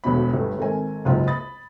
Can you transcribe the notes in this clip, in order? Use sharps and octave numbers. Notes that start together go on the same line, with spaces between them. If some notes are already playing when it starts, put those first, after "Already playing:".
E1 D2 B2 B5
G1 A2
G#1 C4 A4 A#4 G#5
F#1 C#2 G#2 F4
B5 D#6 A6